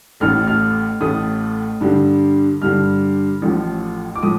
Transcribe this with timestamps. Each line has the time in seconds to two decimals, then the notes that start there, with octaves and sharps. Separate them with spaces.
0.20 A1 A2 A3 F6
0.48 F6
1.01 A1 A2 A3 D#6
1.81 G2 D3 G3
2.61 G2 D3 G3 F6
3.42 A1 A2 F3
4.16 D6
4.22 A2 F3 D#6